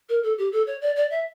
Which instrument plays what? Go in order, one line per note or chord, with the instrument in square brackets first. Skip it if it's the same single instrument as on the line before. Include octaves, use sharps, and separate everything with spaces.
[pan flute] A#4
A4
G4
A4
C#5
D5
D5
E5